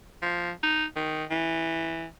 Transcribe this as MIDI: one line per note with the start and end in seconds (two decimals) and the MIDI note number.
0.22 0.51 53
0.63 0.85 63
0.96 1.24 51
1.30 2.05 52